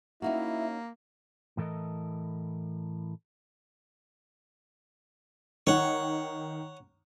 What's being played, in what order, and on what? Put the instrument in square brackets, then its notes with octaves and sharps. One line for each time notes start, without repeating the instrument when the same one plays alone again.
[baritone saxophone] A#3 [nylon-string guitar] C#4 D#4 F#4 [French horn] E4 [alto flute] E5
[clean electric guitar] A2 E3 A4 A#4 D#5
[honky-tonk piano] D#3 [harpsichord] C#5 F#5